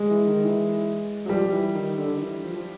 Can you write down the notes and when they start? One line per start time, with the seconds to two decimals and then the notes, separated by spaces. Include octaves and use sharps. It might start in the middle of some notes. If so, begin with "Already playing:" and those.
Already playing: G#3
0.10 E3
0.27 D#3
0.44 E3
1.25 F#3
1.29 F3 G3
1.52 E3
1.75 D#3
1.97 D3
2.16 D#3
2.21 E3
2.43 F3
2.56 F3